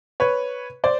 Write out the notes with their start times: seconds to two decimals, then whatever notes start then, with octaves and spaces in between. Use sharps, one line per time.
0.20 B4 C#5
0.84 C5 D5